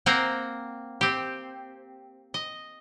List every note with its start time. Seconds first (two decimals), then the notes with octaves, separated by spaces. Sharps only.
0.06 A#3 C4 C5 F#5 A#5
1.01 C4 G4
2.34 D#5